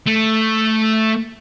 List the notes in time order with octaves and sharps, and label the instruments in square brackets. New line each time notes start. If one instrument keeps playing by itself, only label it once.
[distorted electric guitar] A3